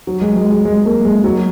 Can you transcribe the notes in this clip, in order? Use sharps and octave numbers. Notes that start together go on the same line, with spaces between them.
F#3
G#3
G#3
G#3
G#3
A#3
G#3
F#3